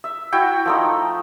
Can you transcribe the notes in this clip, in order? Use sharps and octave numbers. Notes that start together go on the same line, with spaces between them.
E5
E4 F#4 G5
F3 A3 D#4